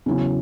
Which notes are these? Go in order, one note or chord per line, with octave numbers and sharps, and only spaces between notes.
E2 C#3 F#3 C#4 E4